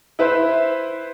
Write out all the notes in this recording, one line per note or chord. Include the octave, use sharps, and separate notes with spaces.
E4 B4 C5 E5